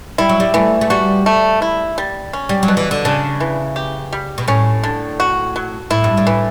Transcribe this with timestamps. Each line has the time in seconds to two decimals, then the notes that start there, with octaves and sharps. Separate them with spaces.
0.18 G3 E4
0.29 F#3
0.40 G3
0.54 E3 A3
0.81 A3
0.90 G3 F#4
1.26 A3
1.62 E4
1.98 G3
2.33 C#4
2.49 G3
2.63 F#3
2.68 B2
2.77 E3
2.91 D3
3.05 C#3 D4
3.40 E3
3.76 G4
4.13 G3
4.38 B2
4.48 A2 C#4
4.84 D3
5.20 F#4
5.56 F#3
5.90 A2 E4
6.04 G2
6.17 A2
6.27 E3